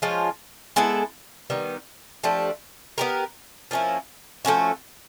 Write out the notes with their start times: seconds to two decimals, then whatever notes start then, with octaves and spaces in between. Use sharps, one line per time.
0.02 F3 G#3 C#4 F4
0.76 G#3 B3 E4 A4
1.50 D#3 G3 B3
2.24 F3 A3 D4 G4
2.98 B3 D#4 G4 A#4
3.71 F3 A#3 C#4 E4
4.45 F3 A3 C#4 F#4